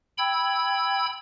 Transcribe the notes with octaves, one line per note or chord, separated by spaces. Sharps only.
G5 B5 E6 G#6